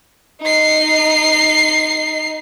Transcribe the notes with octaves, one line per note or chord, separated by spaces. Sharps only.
D#4 C7